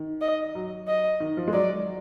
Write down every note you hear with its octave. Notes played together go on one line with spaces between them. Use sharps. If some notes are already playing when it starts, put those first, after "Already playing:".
Already playing: D#3
D#5
F#3
D#5
D#3
F3
G#3
F#3 D5